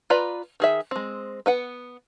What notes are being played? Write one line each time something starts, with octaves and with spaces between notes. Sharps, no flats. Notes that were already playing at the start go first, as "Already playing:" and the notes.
F4 B4 D5 A#5 B5
D#3 G#4 E5
G#3 C4
B3 B4 F#5